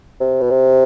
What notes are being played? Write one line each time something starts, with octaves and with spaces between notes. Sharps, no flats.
C3
B2
C3